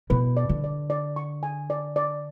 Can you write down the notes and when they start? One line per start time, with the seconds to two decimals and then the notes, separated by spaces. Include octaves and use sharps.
0.10 B2 B4
0.37 D5
0.49 D3
0.64 D5
0.90 D5
1.16 C#6
1.43 G#5
1.70 D5
1.96 D5